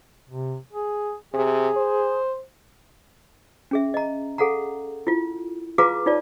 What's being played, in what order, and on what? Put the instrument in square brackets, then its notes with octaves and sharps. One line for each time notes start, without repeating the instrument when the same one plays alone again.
[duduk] C3
G#4
[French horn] C3 [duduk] G#4
[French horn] C5
[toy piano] C#4 G#4 E5
D#5 A#5
G#4 A4 F5 F#5 A#5
E4 F4
F4 G#4 B4 F5 A#5 D6
D#4 F4 C#5 D5 A5